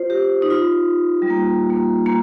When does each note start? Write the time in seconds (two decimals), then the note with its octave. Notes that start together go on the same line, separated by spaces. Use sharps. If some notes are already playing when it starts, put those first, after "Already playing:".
Already playing: F4 C5
0.10 G4
0.42 D#4
0.50 F4
1.22 G3
1.30 A#3
1.70 A#3
2.06 A#3